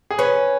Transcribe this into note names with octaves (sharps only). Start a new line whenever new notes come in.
G#4
C#4 B4